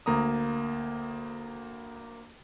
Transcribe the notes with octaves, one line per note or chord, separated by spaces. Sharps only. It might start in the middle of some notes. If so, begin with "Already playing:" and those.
D2 A#3 A#5 D#6